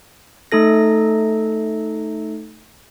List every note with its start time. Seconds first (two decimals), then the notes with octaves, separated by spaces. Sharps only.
0.52 A3 D#4 A4 A#6